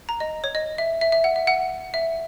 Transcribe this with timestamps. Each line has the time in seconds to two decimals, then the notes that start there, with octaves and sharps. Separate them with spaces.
0.09 A#5
0.20 D#5
0.44 C#5
0.55 D#5
0.78 E5
1.01 E5
1.12 E5
1.24 F#5
1.36 E5
1.47 F#5
1.94 E5